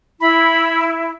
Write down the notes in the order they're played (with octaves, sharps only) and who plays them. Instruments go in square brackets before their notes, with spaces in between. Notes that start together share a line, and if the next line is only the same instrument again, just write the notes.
[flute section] E4 [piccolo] B5